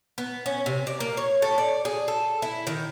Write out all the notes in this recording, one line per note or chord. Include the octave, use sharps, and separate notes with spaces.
B3
C#4
C3
D5
A#3
C#5
A4
D5
G#4
A4
E4
D#3